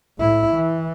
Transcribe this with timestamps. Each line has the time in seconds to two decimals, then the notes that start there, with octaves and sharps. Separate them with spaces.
0.19 A2 E4
0.54 E3